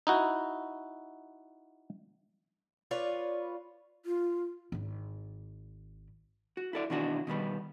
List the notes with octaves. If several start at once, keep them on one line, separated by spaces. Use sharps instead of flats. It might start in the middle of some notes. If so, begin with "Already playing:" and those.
D#4 E4 F#4
F4 B4 C#5 D5
F4
G#1 E4
F#4
E4 A4 D5
B2 D#3 E3 D4 F#4
B2 D#3 G3 B3